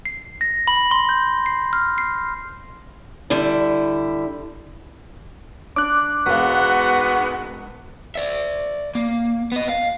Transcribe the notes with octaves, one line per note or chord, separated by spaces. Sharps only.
C7
A#6
B5
C6
G6
C7
F6
C7
D3 G3 E4
D4 D6 F#6
E1 G#2 G#3 B3 F#4 F5
D5 E5
A#3
B3 D#5
F5